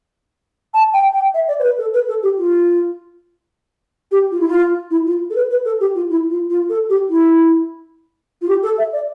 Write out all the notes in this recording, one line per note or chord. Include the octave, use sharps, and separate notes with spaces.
A5
G5
G5
E5
D5
C5
B4
A4
B4
A4
G4
F4
G4
F4
E4
F4
E4
F4
A4
B4
B4
A4
G4
F4
E4
F4
F4
A4
G4
E4
F4
G4
A4
E5
D5